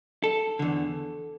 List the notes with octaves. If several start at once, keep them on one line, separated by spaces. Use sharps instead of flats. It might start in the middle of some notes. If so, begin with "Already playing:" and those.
A4
E2 D3